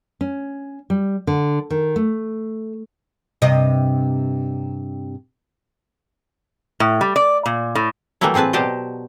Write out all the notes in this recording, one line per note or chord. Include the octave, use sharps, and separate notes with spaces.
C#4
G3
D3
D#3
A3
G2 C3 D#5
A2
G3
D5
A#2
A2
E3 F#3 G3 A3 A#3 E4
A2 C4 G#4 B4 A5
B2 F#3 G4 C5 D5 D#5